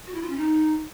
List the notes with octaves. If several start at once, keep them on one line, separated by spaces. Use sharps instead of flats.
F#4
E4
F4
C#4
D#4